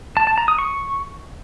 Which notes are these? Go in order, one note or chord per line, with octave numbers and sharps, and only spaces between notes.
A5
A5
A#5
D#6
C#6